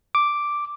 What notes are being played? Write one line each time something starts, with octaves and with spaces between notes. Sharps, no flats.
D6